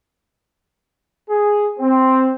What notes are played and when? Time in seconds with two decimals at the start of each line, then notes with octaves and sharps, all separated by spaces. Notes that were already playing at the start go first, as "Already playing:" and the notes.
1.29 G#4
1.78 C4